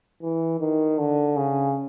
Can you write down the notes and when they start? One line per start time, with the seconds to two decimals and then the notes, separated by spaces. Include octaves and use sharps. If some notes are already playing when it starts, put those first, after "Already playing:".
0.22 E3
0.60 D#3
0.99 D3
1.37 C#3